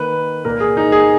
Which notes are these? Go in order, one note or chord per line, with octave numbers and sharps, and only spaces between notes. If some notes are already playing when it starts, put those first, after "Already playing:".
Already playing: D#3 A#3 B4
A#2 A#3 A#4
G#4
D#4
G#4